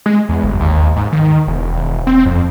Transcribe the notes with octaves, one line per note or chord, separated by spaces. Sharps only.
G#3
E2
G1
D#2
G#2
D#3
E1
C4
F2